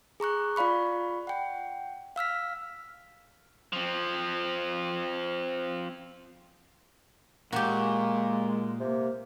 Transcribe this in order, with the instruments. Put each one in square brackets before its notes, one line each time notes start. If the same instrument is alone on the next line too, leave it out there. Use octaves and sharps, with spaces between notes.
[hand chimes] G#4 A#5 C#6 F#6
F4 D5 F5 B5 C#6
F#5 G5
F5 E6 F6 B6
[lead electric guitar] F3 C4
[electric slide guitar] A#2 [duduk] G#3 [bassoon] A#3 [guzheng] F#4 G4
[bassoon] C3 [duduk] A#3